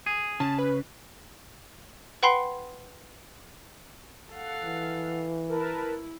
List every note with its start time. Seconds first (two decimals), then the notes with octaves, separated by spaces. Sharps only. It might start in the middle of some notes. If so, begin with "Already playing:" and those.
0.06 G#4
0.40 C#3 A5
0.59 B4
2.23 B4 F#5 G5 B5 C6 C7
4.33 A4 F5 F#5
4.64 E3
5.49 E4 A#4 B4 A5